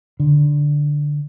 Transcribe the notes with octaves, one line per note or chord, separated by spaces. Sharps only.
D3